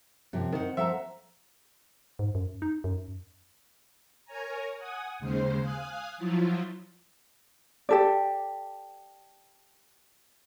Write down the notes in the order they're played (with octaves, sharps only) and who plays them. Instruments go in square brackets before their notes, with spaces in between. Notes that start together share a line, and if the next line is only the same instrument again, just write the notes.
[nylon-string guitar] F#2 C3 F3 [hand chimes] C4
[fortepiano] D#3 [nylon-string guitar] C5 F#5
[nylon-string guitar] F3 A4 [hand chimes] C5 F#5 A#5 [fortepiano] E5
[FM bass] G#2
F#2
D#4
F#2
[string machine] A#4 C#5 G#5 A#5
F#5 G#5 D#6
D#2 C#3 G#3 C5 C7
F5 G#5 D#6 F#6
F3 F#3 E4 F4
[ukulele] G4 A4 D5